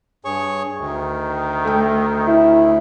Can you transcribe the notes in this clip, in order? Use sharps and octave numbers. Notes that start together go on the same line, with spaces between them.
G2 G#4 C#5 C#6
D2 D#3
A3 G5
E4